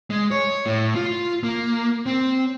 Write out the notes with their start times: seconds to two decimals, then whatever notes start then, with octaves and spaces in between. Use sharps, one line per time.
0.10 G#3
0.31 C#5
0.66 A2
0.96 F4
1.43 A#3
2.06 C4